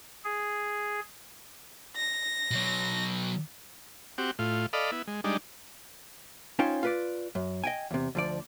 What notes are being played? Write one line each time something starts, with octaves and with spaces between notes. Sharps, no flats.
G#4
A#6
B2 F#3
C4 F#4 G4
A2 F4
A4 D5 D#5 F5 B5
B3 E4
G#3
G3 G#3 D4 D#4
C#4 D#4 F4 C5 C#5 G5
F4 B4 D5
F#2
D#5 G5 G#5
E2 C3
D2 F3 D5